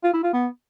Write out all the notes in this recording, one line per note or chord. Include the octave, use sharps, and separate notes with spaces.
F4
E4
F4
B3